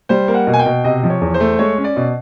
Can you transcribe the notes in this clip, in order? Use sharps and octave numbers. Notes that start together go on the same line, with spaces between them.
G3 C5
A#3
F#5
B2
G#5
G5
B2
C3 D#5
F3
C#5
E2
C5
A3
G#3 C#5
C#4
D5
B2